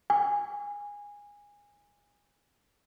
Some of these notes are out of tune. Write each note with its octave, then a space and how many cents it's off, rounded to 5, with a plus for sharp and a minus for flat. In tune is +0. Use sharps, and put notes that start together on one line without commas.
G#5 -20